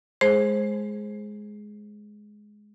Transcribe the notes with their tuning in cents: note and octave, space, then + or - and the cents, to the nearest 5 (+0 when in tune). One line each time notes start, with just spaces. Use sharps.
G#3 +10 G#4 +5 C5 +20